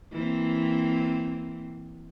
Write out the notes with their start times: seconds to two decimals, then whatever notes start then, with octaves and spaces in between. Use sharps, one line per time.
0.11 E3 A#3 C4